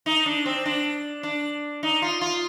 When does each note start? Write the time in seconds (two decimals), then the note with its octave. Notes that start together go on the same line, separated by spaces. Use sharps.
0.06 D#4
0.26 D4
0.45 C4
0.65 D4
1.23 D4
1.83 D#4
2.02 F4
2.21 F4